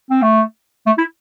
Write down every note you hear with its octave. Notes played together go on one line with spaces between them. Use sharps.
C4
A3
A3
E4